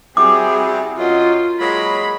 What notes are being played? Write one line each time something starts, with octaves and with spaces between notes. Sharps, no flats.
G3 C4 E4 F#4 G#4 D6
F#2 F#3 F4 D#5
F#3 G#3 A#3 B5